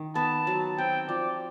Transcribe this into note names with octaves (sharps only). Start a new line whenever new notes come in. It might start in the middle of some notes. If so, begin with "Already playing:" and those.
Already playing: D#3
B3 A5
F#3
C4 G5
F3 D5